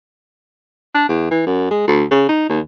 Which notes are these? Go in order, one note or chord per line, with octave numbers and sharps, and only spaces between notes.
D4
E2
E3
F#2
G#3
D2
C#3
D#4
D#2